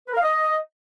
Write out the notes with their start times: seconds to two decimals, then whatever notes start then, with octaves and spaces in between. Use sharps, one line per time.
0.07 B4
0.12 A#4
0.17 F5
0.22 D#5